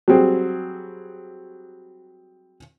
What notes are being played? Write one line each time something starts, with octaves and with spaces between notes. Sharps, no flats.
F#3 G3 C4 G#4